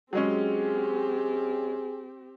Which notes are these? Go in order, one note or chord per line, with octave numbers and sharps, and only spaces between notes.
F#3 G#3 C4 C#4 G4 G#4